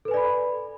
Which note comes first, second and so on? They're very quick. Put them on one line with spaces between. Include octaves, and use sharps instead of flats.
A4 B4 G#5 D5 B5